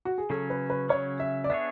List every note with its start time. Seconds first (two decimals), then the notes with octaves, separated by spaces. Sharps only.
0.05 F#4
0.18 G#4
0.30 C#3 F#3 C#4 A4
0.50 B4
0.70 B4
0.89 C#3 F#3 C#4 C#5
1.20 E5
1.44 D5
1.50 B3 D4 G#4 C#5 E5